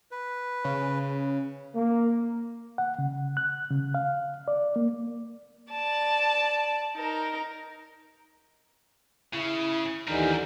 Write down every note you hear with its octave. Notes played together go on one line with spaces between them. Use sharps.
B4
C#3
A#3
F#5
C#3
F#6
C#3
F5
D5
A#3
D5 A5
D#4 A#4
C#3 E4
D#2 D3 E3 G3 D#4 A#4